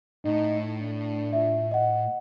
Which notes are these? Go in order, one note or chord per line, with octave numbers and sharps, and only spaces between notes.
A2 D#4
D4
F4 E5
D#5 F#5